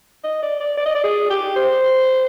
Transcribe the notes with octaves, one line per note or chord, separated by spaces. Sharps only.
D#5
D5
D5
D5
D#5
D5
G#4
G4
C5